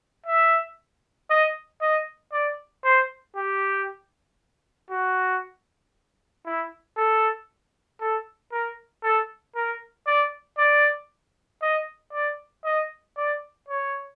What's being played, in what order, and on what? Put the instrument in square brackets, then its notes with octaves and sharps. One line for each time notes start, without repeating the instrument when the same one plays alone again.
[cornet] E5
D#5
D#5
D5
C5
G4
F#4
E4
A4
A4
A#4
A4
A#4
D5
D5
D#5
D5
D#5
D5
C#5